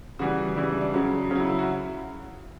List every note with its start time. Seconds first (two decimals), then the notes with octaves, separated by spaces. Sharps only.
0.19 C#3 E3 G3 F#4
0.56 C#3 E3 G3 E4
0.69 D4
0.81 D4
0.94 C#3 F#3 C#4
1.31 C#3 C#4
1.35 F#3 E4
1.49 E4
1.59 F#4